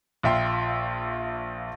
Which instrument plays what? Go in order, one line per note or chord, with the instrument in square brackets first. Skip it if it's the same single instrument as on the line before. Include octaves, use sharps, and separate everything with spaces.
[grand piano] A#1 F4 E5 G5 C6